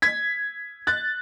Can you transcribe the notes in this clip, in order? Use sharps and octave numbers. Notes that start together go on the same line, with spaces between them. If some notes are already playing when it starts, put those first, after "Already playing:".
G#6 B6
F#6 A6